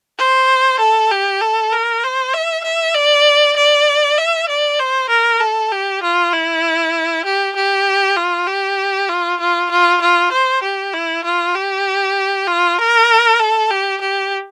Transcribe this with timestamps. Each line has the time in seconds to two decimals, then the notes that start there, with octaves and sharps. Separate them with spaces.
0.18 C5
0.79 A4
1.11 G4
1.41 A4
1.73 A#4
2.03 C5
2.33 E5
2.64 E5
2.95 D5
3.56 D5
4.18 E5
4.49 D5
4.80 C5
5.10 A#4
5.41 A4
5.72 G4
6.03 F4
6.33 E4
7.25 G4
7.56 G4
8.17 F4
8.48 G4
9.09 F4
9.40 F4
9.71 F4
10.02 F4
10.32 C5
10.63 G4
10.94 E4
11.24 F4
11.55 G4
12.47 F4
12.79 A#4
13.40 A4
13.70 G4
14.01 G4